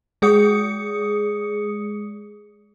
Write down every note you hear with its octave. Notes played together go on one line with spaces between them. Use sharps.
G#3 G#4 D#6 C#7